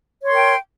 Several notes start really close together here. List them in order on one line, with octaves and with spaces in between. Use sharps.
C#5 C6 A#4 G5